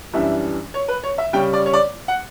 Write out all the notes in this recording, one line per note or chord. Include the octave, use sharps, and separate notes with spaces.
F#2 E3 G3 D4 E5
C#5
B4
C#5
E5
C#3 G3 C#4 G5
D5
C#5
D5
F#5